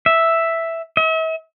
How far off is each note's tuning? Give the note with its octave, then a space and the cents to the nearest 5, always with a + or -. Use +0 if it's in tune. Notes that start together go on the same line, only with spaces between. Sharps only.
E5 +0
E5 -45